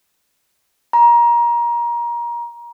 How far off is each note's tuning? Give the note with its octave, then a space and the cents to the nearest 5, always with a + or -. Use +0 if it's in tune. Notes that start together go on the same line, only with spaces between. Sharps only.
A#5 +25